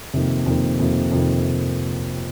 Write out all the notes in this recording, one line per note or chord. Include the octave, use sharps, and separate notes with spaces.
F2 C3 D#3 A#3
F2 C3 D#3 A#3
F2 C3 D#3 A#3
F2 C3 D#3 A#3